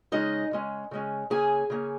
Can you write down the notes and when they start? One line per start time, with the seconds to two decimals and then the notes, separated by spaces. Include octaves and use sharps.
0.12 C#3 G#3 C#4 D#4 D#5
0.51 C#3 G#3 C#4
0.91 C#3 G#3 C#4
1.30 C#3 A#3 C#4 G#4 G#5
1.70 C#3 A#3 C#4